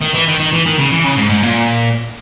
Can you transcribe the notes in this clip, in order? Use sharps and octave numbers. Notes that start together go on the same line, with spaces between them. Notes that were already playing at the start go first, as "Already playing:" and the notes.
D#3
E3
D#3
D#3
E3
D#3
C#3
E3
C#3
G#2
G#2
A#2